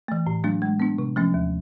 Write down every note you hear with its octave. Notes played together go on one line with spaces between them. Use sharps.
E3 A3
A2
F#3 A3 D4
G#3
B3 D4
C3
F3 A3 C#4
D#2